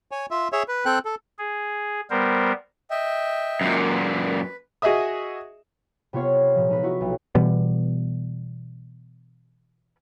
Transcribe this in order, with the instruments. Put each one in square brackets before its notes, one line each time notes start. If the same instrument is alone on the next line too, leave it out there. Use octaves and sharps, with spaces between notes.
[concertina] C#5 G#5
F4 E5
G#4 C#5 E5
B4
C4 A4 G5 F#6
A4
[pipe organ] G#4
G3 B3 A#4 C5
[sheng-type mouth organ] D#5 E5 G5
[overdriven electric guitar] F#2 A#2
[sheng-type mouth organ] B4
[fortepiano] F#4 G#4 D#5 E5 D#6
[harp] C3 B3 F4 C#5 F5 F6
A#2 F3
G#3 D#4 B4
E4 F#4
B1
[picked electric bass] B2 E3 G3 B3